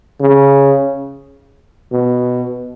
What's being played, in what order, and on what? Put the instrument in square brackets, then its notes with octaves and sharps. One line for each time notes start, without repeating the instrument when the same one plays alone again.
[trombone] C#3
B2